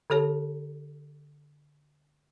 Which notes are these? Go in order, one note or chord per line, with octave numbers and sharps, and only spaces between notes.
D3 G4 A4 C#5 A5